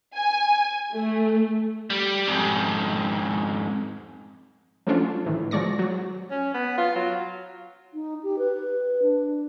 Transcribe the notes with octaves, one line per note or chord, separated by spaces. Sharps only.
G#5
A3
G3
F2 G#2
F3 F#3 A3 C#4 D4 F4
A2 D#3 E3
F3 F#3 G#3 D5 C#6 A#6
F#3
C#4
B3
F4
F#3
D#4
G4
B4
D4